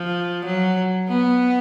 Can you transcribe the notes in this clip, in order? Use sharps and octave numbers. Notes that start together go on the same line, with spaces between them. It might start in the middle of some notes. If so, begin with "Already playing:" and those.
Already playing: F3
F#3
B3